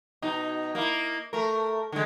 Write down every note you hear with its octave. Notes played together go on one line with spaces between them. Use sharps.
B2 D#4
A#3 E4
A3 A#4
D3 G#3